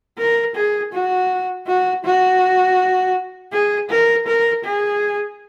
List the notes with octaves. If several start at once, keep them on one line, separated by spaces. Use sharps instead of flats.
A#4
G#4
F#4
F#4
F#4
G#4
A#4
A#4
G#4